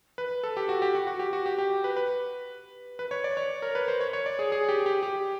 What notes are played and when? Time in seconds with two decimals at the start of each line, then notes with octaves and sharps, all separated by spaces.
0.18 B4
0.43 A4
0.57 G4
0.69 F#4
0.82 G4
0.95 F#4
1.07 F#4
1.19 G4
1.33 F#4
1.46 G4
1.58 G4
1.84 B4
1.96 B4
2.99 B4
3.11 C#5
3.24 D5
3.37 C#5
3.62 A#4
3.75 B4
3.88 C5
4.01 C#5
4.13 C#5
4.26 D5
4.39 G#4
4.52 G#4
4.69 G4
4.86 G4
5.03 G4